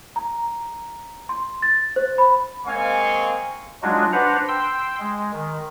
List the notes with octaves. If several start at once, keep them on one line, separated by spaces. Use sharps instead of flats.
A#5
C6
A6
C5
B5
G#3 A#3 C4 F5 G#5 C#6
F#3 G#3 D4 D#4 F4 F#4
D4 B4 C5 D5 F#5 A#5
G5 C6 E6
G#3
D#3